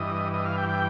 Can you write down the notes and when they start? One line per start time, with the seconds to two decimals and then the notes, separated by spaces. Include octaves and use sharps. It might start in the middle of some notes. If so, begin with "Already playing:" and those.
Already playing: G2 E3 D#5
0.34 D#5
0.45 F5
0.58 G5
0.69 G5